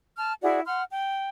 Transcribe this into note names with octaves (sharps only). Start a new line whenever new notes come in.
A5 F6
E4 F#4 G#4 D5
F#5 C6 F6
G5